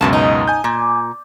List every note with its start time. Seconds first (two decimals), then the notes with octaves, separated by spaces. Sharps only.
0.01 C#2 F#2 B2 A3 A#3 A5
0.13 D#4
0.48 G#5 G6
0.64 A#2